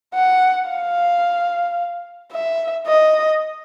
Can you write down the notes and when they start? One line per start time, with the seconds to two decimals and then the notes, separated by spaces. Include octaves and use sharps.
0.14 F#5
0.69 F5
2.32 E5
2.87 D#5